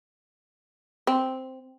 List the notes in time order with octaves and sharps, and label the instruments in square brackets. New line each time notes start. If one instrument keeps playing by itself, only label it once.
[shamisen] C4